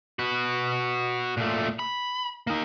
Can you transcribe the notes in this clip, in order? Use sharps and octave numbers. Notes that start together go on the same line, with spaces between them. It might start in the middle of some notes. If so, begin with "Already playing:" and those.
F#4 B4
A#2 A3
B5
A#3 D#4